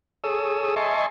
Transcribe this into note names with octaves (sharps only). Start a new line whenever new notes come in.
G#4 A4 C#5 D#6 E6
D#5 E5 G#5 A5 C6 C#6